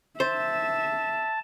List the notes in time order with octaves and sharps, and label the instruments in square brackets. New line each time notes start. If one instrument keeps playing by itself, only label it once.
[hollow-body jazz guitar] C5 [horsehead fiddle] E5 [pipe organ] A5